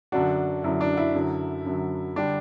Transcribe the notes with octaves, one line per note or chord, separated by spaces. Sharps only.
F#2 D3 F#3 D4 F#4
F#2 D3 F#3 E4
D4
E4
F#2 D3 F#3
F#2 D3 F#3
D3 G3 D4